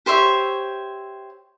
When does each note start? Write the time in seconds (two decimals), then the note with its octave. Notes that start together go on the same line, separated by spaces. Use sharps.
0.06 G4 C5 C#5 E5